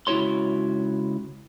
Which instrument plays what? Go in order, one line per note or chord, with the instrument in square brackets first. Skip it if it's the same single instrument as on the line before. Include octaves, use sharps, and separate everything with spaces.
[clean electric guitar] C#2 E4 F#4 C#5 C6